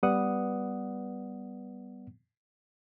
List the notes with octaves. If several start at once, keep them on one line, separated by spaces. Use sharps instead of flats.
G3 B3 B4 D5 F#5 D#6